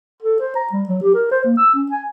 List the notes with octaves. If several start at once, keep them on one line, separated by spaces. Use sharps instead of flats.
A4
C5
A#5
G3
F#3
G4
A#4
C5
A#3
E6
C#4
G#5